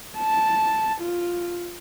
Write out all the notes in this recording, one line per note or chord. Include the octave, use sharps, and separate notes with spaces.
A5
F4